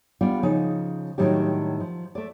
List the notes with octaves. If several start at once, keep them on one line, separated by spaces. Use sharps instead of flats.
G3 B3 D4 F4 D5
C#3 F3 D#4
A2 D#3 F#3 G3 D4 G4
F3
A3 D5